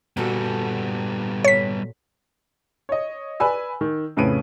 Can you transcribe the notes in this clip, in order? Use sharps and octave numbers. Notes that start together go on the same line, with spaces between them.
A#2 G3 B3 F#4 A4
C#5 B6
C#5 D#5
B4 D5 G#5 B5 E6
D#3
F2 A2 C#3 B4 D7 D#7